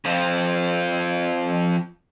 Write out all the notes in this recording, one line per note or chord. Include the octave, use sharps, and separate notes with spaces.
F2 F3